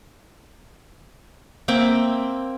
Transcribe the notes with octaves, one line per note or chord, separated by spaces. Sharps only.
A#3 C4 E5 G5